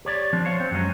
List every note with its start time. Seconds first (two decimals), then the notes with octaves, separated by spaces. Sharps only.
0.05 G4 C#5 D5
0.33 F3 C4 D4
0.45 C5 C#5 F5
0.60 C4
0.71 F#2 F#3 G#3 C#4